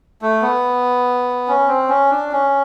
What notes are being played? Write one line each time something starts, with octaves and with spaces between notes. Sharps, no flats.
A3
B3
C#4
C4
C#4
D4
C#4